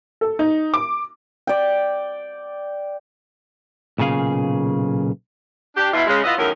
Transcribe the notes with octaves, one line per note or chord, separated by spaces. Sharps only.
A4
D#4
D6
D5 G5
B1 A#2 C#3 G#4 F5
D4 G4
B2 E4 F4
C#3 G#3
B3 E4 F4 D#5
E2 A2 D#3 F#3 C#4 A#4